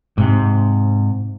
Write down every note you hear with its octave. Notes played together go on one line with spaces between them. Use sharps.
G#2 C3